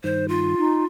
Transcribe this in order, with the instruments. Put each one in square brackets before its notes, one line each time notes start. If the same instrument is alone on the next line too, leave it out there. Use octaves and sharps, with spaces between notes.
[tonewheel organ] G2 D#3 [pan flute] C5
[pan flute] F4
[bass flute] D#4